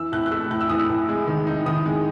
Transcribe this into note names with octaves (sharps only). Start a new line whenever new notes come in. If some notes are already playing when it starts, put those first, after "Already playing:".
Already playing: E3 E6
A2 F#6
F#6
A3 E6
A2 F#6
E6
E3 D#6
E6
A2
G#3
D#3
D#4
D#3 D#6
G#3